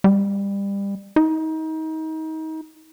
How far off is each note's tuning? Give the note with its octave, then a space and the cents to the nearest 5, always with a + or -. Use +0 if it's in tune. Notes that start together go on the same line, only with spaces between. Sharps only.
G3 +25
D#4 +30